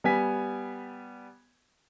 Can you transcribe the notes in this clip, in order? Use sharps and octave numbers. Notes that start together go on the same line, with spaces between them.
G3 B3 G#5 B6